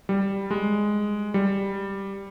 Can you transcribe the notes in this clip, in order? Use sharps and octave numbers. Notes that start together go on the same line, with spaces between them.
G3
G#3
G3